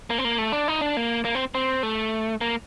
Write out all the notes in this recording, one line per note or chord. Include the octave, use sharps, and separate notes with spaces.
A#3
C4
A#3
A3
D4
D#4
D4
A#3
A#3
C4
C4
A3
A#3